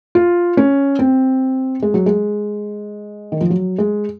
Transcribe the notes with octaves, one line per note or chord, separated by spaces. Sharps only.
F4
C#4
C4
G#3
F#3
G#3
D#3
F3
F#3
G#3